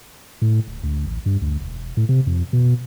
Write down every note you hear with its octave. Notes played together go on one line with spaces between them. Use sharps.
A2
D1
D2
A1
G2
D2
E1
A2
C3
F2
B2